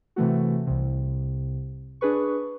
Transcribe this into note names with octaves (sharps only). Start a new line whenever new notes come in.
C3 E3 A3 F#4
C2 C3
D4 G#4 B4 C#6